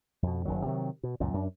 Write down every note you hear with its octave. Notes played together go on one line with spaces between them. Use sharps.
F2 B2
F#1 F#2 D#3 F#3
C3 D#3 F#3
B2
C#2 F#2 A#2
F#2 D4